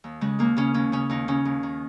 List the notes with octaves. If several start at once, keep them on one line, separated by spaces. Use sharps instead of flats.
D#2
C#3 G#3
D#2 A#3
C#3 C#4
D#2 C#4
C#3 C#4
D#2 D#4
C#3 C#4
D#2
D#3